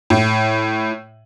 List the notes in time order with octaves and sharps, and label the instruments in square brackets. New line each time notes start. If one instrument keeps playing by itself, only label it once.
[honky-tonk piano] A2